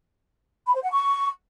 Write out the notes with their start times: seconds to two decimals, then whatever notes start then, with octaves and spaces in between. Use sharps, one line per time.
0.67 B5
0.75 C5
0.83 F#5
0.91 C#6